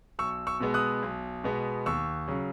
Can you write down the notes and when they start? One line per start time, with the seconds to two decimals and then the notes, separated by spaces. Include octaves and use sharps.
0.19 B1 C#6 E6
0.47 C#6 E6
0.60 B2 G#3 B3
0.74 D#6 F#6
1.03 B1
1.44 B2 G#3 B3
1.86 D#2 C#6 E6
2.28 C#3 F#3